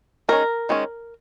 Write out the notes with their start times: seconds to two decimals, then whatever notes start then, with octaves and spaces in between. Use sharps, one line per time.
0.29 D#3 G#3 C#4 A#4
0.69 D#3 G#3 C#4